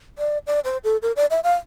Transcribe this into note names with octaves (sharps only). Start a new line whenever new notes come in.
D5
D5
C5
A4
A#4
D5
E5
F5